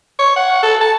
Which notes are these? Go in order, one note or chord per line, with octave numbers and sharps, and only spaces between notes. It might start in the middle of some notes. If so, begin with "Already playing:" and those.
C#5
F#5
A4
A5